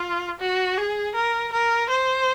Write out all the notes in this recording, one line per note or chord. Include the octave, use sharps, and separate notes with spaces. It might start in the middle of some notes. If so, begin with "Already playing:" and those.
Already playing: F4
F#4
G#4
A#4
A#4
C5